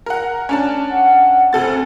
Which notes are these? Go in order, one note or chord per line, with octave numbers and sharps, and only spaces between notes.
A#4 F#5
C#4 D4 A5
F#5
D2 C4 A4 A6